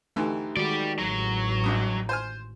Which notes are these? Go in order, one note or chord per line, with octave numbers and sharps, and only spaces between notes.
D2 E3 A3 D#4 G4
D#3 G#3 F#4 G4 D5
A1 F#3
G#1 G2 D#6
C5 G#5 F6